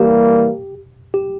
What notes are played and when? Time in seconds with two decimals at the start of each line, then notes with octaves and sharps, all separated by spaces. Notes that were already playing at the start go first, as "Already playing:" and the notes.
Already playing: E3 G3 A#3 G4
1.14 G4